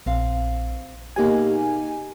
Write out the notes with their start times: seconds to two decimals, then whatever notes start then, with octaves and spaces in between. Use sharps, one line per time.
0.06 A#1 C4 F5
1.16 B2 A#3 D#4 G4 G#4 G#5